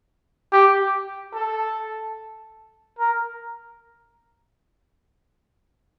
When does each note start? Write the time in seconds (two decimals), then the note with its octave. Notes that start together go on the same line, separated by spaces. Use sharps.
0.52 G4
1.35 A4
2.99 A#4